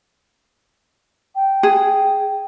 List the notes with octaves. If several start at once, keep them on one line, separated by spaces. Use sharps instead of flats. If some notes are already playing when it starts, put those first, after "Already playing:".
G5
G#4